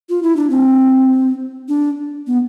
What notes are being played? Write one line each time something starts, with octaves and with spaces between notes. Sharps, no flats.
F4
E4
D4
C4
D4
B3